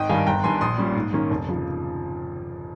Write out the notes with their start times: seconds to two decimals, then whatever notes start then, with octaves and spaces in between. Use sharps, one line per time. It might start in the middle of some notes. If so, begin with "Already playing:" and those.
Already playing: G#1 D#5 G5
0.09 G2 D#3 G3 F5 G#5
0.26 G1 G5 A#5
0.44 G2 D#3 G3 G#5 C6
0.61 A#1 C6 D#6
0.78 A#2 G3 C#4
0.95 G#2
1.13 D#3 A#3 C#4
1.30 F1
1.48 C#3 F3